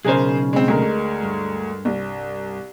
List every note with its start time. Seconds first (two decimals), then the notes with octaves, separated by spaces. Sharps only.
0.05 B1 C#3 G#4 A#4 C5
0.53 G#3 C4
0.68 D2 G#3 A#4
1.23 G2
1.85 C2